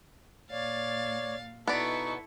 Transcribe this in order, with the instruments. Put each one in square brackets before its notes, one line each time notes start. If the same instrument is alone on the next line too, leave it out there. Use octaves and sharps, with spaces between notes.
[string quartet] A#2 F5 A6 [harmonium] C#5 D5
[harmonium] B2 D#4 F#4 [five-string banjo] B3 D5 [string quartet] E4 A4 C#6